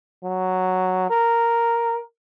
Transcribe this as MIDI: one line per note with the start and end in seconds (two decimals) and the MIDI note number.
0.24 1.07 54
1.10 2.01 70